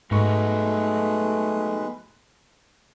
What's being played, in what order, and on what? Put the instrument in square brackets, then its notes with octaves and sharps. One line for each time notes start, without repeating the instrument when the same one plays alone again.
[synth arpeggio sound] G#2 C#6 [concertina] G#3 B4 [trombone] A3 [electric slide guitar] B3 D#4 F#4